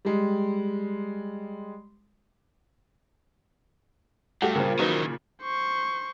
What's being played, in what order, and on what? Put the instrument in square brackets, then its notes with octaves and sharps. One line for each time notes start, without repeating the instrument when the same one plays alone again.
[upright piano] G3 G#3
[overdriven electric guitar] G2 [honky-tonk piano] A3 F#4 G4
[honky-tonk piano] A#2 C#3 [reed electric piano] A#4 C5
[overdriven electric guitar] D#3 E3 [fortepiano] F#3 D#4 B4
[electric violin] C5 C#6